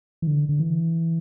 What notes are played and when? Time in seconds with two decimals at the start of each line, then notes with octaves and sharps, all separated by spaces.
0.22 E3
0.27 D3
0.49 D3
0.59 E3